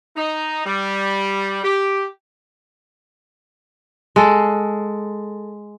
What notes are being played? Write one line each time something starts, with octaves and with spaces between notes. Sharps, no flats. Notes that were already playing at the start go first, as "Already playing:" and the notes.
D#4
G3
G4
G#3 A4